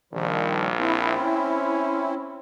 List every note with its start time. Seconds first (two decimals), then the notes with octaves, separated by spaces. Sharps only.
0.13 A#1 D#3 F3 G3
0.79 C4 E4
1.21 C#4